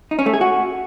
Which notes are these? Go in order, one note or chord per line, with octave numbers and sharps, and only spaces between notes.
D#4
C#4
A3
G#4
F#4